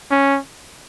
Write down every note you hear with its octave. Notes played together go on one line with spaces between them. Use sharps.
C#4